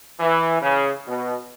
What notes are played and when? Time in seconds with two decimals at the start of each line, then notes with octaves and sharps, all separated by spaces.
0.20 E3
0.62 C#3
1.07 B2